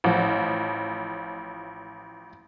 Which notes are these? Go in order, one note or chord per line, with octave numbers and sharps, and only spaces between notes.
A1 F3